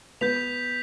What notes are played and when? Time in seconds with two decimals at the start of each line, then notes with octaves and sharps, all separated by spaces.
0.21 B3 G6 B6 F7